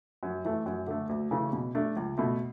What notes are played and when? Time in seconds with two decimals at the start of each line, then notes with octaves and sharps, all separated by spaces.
0.23 F#2
0.45 E3 A3
0.66 F#2
0.87 D3 A3
1.09 D2
1.31 C#3 E3 A3
1.53 B2
1.75 A3 D4
1.96 C#2
2.18 B2 A3